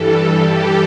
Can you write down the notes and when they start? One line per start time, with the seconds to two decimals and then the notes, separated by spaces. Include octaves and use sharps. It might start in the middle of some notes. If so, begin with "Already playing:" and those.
Already playing: G2 E3 G3 A4
0.45 G4